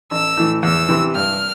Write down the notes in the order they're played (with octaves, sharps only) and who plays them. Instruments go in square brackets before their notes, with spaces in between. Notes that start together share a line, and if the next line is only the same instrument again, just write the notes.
[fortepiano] A1 [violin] E6
[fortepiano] A2 E3
[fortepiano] E2 [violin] E6
[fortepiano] C3 E3
[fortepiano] G2 [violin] F6